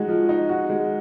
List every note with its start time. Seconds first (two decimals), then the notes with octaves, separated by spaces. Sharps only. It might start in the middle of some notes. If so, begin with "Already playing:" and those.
Already playing: G#3 D#4 F#4
0.08 F3
0.29 D#4
0.49 F#4
0.70 G#3